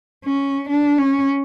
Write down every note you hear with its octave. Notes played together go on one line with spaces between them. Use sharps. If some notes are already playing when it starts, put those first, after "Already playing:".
C#4
D4
C#4